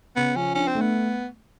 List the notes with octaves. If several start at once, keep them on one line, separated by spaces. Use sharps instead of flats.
C#3 B3
F3 C#4
C#4 D4
C4
A3
B3